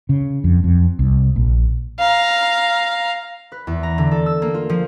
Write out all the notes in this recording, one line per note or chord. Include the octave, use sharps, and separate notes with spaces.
C#3
F2
F2
C2
A#1
F5 A#5
B4
E2
A#5
D3
A4
E6
A#3
F4
F3